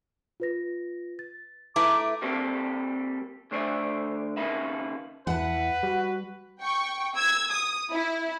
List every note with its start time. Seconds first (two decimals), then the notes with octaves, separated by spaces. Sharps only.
0.40 F4 B4 A#6
1.19 A6
1.76 A3 E4 B4 A5 A#5 D6
2.22 G3 A#3 C4 G4 A4
3.51 D3 A3 C5 D5 E5
4.37 D#2 C#3 A#3 D#4 B4 E5
5.27 E2 E4 B4 F#5 A5
5.83 G3 F#4
6.61 G5 C#6
7.14 E6 G#6
7.50 D#6
7.92 E4